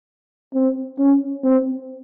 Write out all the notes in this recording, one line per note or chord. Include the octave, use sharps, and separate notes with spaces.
C4
C#4
C4